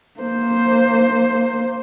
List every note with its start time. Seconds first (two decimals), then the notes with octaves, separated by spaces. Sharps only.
0.20 A#3 C5